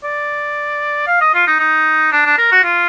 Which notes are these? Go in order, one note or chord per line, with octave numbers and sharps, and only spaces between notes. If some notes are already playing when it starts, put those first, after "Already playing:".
D5
F5
D#5
F4
D#4
D#4
D4
D4
A#4
F#4
F4